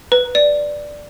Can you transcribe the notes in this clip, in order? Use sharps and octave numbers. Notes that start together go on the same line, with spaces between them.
B4
D5